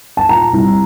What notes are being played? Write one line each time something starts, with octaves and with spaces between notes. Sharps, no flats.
A5
A#2 A#5
C2